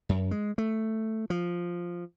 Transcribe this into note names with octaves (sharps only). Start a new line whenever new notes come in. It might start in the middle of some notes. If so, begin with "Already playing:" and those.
F#2
G#3
A3
F3